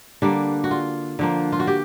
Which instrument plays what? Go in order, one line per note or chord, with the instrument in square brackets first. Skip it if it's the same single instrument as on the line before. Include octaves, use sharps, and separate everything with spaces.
[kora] D3 G3 A#3 D4
F#4
F4
D3 F3 A#3
F4
F#4
G4